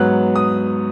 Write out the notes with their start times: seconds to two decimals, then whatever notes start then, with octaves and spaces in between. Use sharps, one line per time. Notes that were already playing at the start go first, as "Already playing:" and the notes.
Already playing: G#2 F#3 B3 F#6
0.36 D#6